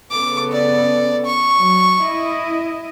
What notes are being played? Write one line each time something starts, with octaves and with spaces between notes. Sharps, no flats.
C#3 B3 A4 D6
D5
C#6
F#3
E4 D#5